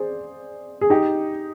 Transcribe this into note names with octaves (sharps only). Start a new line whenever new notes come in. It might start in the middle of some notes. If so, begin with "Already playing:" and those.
Already playing: G#4 C5 D5
G#4
D#4 G4